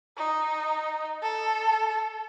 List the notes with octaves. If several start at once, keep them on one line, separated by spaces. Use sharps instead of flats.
D#4
A4